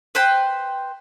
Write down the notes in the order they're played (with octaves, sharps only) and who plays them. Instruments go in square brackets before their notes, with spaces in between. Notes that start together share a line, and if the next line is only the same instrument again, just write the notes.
[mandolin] B4 C5 G5